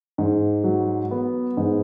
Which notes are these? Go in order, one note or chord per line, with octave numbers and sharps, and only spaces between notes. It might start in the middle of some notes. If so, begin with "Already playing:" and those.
G#2
F#3
B3
G#2